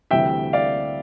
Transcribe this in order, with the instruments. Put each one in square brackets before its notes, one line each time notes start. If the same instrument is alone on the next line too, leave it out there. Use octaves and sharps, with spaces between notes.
[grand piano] D2 C3 E3 G3 E5 G5
D5 F5